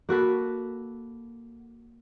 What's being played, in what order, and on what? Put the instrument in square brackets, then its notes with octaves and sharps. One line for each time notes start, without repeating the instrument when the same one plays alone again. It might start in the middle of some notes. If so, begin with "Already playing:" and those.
[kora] A#3 F#4 A4 B4